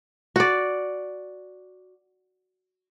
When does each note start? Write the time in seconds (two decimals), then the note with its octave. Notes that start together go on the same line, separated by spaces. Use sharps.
0.36 F#4 D5